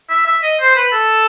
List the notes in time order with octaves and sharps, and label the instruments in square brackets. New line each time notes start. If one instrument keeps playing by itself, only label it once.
[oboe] E5
E5
D#5
C5
B4
A4